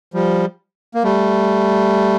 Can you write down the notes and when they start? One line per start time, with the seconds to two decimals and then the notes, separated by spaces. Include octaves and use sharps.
0.14 F3 G3
0.95 A#3
1.04 G3 A3